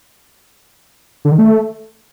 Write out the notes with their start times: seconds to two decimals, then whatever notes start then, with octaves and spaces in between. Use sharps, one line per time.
1.25 D3
1.32 D#3
1.39 A3